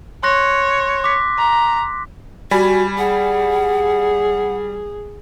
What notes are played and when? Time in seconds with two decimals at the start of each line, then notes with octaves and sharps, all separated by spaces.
0.23 C#5 C6 F#6 A#6
1.04 D6 B6
1.38 A#5
2.51 G3 F#4 G#5 B5
2.98 G#4 F#5